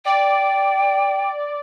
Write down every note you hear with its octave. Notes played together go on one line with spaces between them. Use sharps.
D5 G5